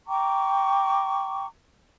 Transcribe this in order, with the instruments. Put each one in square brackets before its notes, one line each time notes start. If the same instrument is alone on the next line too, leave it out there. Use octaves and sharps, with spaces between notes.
[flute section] G5 A#5 C#6 D6